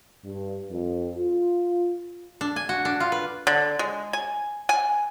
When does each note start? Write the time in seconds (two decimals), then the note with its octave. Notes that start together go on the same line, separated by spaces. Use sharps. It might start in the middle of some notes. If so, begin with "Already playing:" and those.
0.25 G2
0.70 F2
1.17 F4
2.41 D4
2.56 G#5
2.69 F#4
2.85 D4
3.00 F4
3.12 B4
3.47 D3
3.79 G#3
4.13 G#5
4.69 G#5